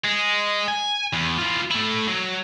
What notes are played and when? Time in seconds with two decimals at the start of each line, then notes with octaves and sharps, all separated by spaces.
0.04 G#3
0.68 G#5
1.13 E2
1.38 E3 F4
1.71 A3 E4
2.08 F#3